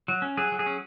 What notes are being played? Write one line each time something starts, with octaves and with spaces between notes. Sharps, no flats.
F#3
C#4
F#3 G#4
F#3
G#4
C#4